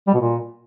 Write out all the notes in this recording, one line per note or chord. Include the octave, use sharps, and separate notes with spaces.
G3
B2
A#2